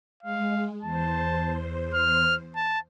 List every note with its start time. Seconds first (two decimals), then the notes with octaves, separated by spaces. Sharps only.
0.23 G#3 F5
0.82 E2 C5 A5
1.94 F6
2.56 A5